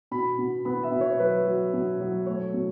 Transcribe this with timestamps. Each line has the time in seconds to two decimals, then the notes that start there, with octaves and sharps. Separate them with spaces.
0.11 B2 B5
0.39 B2
0.65 B3 B5
0.83 E5
0.92 B2
1.01 C#5
1.19 F#3 B4
1.47 F#3
1.74 B2
2.00 F#3
2.26 A3 C#5
2.54 B2